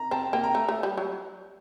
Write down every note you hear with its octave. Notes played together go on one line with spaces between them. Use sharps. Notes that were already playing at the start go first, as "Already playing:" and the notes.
Already playing: A#5
C4 A5
A#3 G5
A#5
A3
A3
G3
F#3